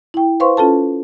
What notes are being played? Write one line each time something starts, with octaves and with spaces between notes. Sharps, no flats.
E4 G5
B4 C5 F5 C6 C#6
C#4 F4 A4 A5